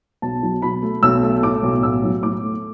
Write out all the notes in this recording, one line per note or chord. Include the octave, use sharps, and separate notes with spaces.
B1 A5
F#3
B2 B5
A3
B1 E6
A3
A2 D6
B1
A1 E6
F#3
A2 D6
A3